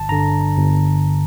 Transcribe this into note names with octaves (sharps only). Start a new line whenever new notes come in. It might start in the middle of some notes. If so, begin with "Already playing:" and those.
Already playing: G1 A5
G2 D3 A#5
G1